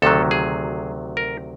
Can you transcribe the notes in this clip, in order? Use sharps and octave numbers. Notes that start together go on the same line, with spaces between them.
D2 C3 D#3 F#3 A4
G#4
A#4